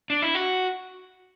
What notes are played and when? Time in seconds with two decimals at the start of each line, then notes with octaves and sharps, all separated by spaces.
0.10 D4
0.22 E4
0.35 F#4